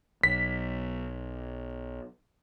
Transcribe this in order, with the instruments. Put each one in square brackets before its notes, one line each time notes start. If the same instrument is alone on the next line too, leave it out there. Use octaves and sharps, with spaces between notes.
[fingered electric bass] B1 [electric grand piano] B6